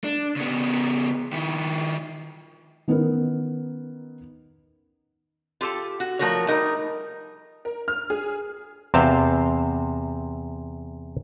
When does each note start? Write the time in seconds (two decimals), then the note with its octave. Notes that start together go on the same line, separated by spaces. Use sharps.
0.04 D4
0.36 C#3 B3
1.33 D#3 E4
2.88 D#3 B3 C#4 D#4 A#4
5.61 F4 G4 A4
6.00 F#4
6.19 F3 A3 F#4 A#4 C#5
6.47 G3 A3 D#4 A#4
7.65 A#4
7.88 F6
8.10 G#4
8.94 E2 C3 C4 C5 F5 A5